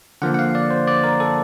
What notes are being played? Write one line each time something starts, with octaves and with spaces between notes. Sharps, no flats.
D3 F3 A#3 F#5
F#5
F5
D5
C5
D5
A#4
A4